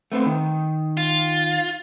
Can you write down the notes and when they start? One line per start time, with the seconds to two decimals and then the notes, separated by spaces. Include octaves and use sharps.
0.12 A3 B3 C4
0.26 D#3
0.97 F4